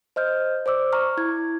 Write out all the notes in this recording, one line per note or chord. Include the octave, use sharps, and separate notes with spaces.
C5 D#5 F6 G6
C5 D5 D6 E6
A#5 C#6 F6
E4 G#6